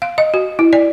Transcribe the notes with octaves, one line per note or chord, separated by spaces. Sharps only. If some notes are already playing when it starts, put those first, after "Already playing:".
F5
D#5
F#4
E4
D5